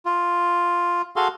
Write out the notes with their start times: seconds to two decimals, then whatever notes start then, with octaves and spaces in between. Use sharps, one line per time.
0.06 F4
1.16 F#4 G#4 A4 F5 C6